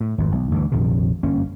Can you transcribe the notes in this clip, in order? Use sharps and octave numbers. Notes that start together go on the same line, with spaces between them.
A2
G#1 F2
B1
D2 G2 D3 E3
A#1 F2 C3 D#3
G1 F#2 A#3 C#4